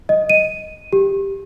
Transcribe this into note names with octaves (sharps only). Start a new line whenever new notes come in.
D#5
D#7
G4